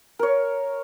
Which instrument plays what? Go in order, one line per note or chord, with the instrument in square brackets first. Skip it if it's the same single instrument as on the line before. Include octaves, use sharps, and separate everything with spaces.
[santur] A#4 C#5